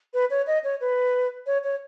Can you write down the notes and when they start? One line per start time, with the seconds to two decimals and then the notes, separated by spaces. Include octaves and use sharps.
0.14 B4
0.30 C#5
0.47 D#5
0.64 C#5
0.81 B4
1.46 C#5
1.64 C#5